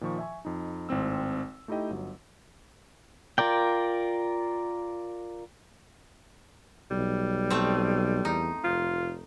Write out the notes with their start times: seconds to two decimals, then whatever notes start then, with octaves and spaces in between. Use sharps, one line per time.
0.01 A#2 D#3 F3 C#6
0.18 E5 G#5 C#6
0.45 F2 D#4
0.89 G#1 A2 C4 E6
1.68 A3 D#4 E4 G4 D#5 G5
1.90 G1 F#3
3.38 F4 A#4 D5 G5
6.91 B1 G3
7.50 A3 C4
8.25 E2 D#4
8.64 F1 F4